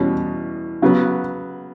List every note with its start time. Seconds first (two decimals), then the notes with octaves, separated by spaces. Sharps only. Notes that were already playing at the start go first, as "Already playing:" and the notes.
Already playing: E2 B2 G3 C#4
0.82 C#3 F#3 B3